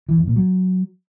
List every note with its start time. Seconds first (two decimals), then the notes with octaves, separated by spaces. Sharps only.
0.09 E3
0.18 F2
0.27 A#2
0.36 F#3